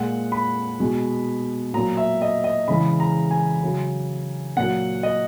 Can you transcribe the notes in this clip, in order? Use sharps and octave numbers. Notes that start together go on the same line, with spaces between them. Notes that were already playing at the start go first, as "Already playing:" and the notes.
Already playing: A#2 G#3 F#5
B5
B2 G#3
A#2 F#3 A#5
E5
D#5
D#5
C#3 E3 G#3 B5
A#5
G#5
C#3 F#3
A#2 F#3 F#5
D#5